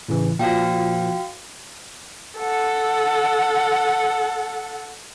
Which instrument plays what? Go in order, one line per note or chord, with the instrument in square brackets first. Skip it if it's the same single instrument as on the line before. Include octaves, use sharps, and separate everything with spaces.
[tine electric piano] A2 C#3 E3
[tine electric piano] A#2 F3 [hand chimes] F#4 F5 G5
[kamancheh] A4 F#5